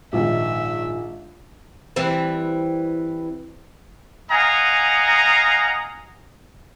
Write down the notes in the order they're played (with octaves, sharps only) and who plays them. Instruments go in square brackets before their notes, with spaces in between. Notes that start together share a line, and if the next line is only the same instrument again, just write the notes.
[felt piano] A#1 G#2 D#3 [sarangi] E5
[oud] E3 G3 C4
[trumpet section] D#5 F5 F#5 G#5 A#5